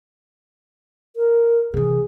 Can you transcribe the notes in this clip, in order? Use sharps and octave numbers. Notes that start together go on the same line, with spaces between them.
A#4
C3 E3 G#4